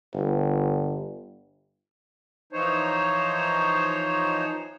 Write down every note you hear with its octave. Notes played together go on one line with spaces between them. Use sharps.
G1
E3 F3 D#4 C5 C#5